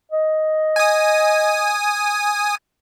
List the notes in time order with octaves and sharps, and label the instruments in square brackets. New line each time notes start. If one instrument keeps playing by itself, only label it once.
[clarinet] D#5
[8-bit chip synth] G#5 D#6